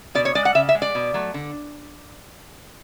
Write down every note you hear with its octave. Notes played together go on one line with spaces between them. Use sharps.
B2 D5
C#5
G#3 D5
F#5
C#3 E5
E5
G#3
D5
B2
F#3 A3
D3